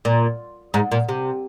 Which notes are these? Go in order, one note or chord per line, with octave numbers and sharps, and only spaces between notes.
A#2
G#2
A#2
C3